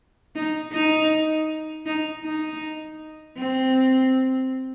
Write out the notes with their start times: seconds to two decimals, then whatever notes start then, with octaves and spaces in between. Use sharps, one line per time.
0.35 D#4
0.72 D#4
1.86 D#4
2.23 D#4
3.37 C4